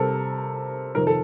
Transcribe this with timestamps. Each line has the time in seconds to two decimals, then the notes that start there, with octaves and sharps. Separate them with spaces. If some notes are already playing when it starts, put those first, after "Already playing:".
Already playing: C3 G3 C4 A4 A#4
0.95 F2 C3 D#3 A#4
1.07 A4